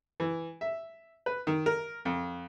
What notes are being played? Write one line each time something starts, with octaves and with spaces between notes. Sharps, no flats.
E3
E5
B4
D#3
A#4
F2